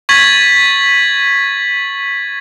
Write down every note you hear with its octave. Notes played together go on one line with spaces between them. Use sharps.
C#6 G#6 A6 B6 F#7